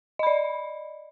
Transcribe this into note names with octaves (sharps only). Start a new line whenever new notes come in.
D5 D#5 B5